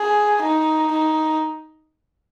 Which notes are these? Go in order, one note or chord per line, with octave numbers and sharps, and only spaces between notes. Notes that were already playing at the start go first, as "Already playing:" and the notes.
Already playing: G#4
D#4
D#4